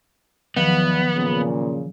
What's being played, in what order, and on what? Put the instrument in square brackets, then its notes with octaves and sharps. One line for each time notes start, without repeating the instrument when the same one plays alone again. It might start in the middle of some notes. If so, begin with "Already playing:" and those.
[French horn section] E2 [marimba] D#3 F3 F#3 [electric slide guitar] B3
[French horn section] A#2 C#3